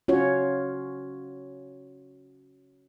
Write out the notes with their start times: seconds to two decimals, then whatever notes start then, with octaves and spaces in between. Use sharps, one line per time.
0.08 C#4 F4 F#4 C#5